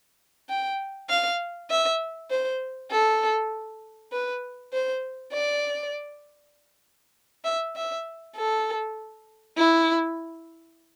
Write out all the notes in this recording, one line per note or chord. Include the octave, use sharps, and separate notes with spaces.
G5
F5
E5
C5
A4
B4
C5
D5
E5
E5
A4
E4